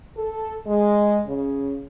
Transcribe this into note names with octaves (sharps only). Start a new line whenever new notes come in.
A4
G#3
C#3